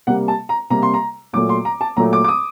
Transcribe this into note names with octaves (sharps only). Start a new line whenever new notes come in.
C3 G3 A#3 F#5
A5
A#5
C3 G3 A#3 A#5
C6
A#5
A#2 F#3 A3 D6
C6
A#5
A5
A#2 F#3 A3 A#5
D6
D6
D#6